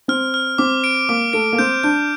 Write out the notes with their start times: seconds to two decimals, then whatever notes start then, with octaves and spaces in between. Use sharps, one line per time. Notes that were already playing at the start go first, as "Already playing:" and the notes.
0.08 C4 F6
0.34 F6
0.58 C4 D6
0.84 D7
1.09 A#3 D6
1.33 A3 D7
1.53 A#3
1.58 C4 G6
1.83 D4 G6